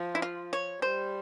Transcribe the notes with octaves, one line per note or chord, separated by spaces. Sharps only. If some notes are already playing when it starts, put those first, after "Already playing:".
Already playing: F3
E4
F4
C#5
G3 C5